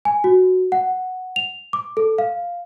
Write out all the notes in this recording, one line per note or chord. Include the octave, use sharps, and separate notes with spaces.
G#5
F#4
F#5
F7
D6
A4
F5